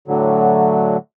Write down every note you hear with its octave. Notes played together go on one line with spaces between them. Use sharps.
A2 D3 F#3